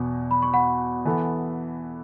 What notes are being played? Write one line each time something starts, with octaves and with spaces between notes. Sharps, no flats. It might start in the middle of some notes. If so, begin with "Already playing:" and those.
Already playing: E2 B2 B3
B5
C#6
F#5 B5
E3 B3 A4